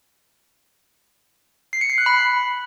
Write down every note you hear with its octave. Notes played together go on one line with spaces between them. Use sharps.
C7
C#7
C7
F#6
B5